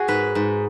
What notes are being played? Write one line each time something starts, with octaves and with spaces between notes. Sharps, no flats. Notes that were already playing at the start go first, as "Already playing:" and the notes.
Already playing: F#4 G#4
G#2 B4
G#2